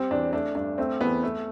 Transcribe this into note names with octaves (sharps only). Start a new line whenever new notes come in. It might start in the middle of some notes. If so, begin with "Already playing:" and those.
Already playing: G3 C4
E2 D4
A3 D4
G2 D4
A3 C4
E2 B3
A3